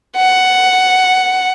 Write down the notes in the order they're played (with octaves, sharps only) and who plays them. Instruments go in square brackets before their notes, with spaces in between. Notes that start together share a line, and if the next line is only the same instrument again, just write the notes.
[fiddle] F#5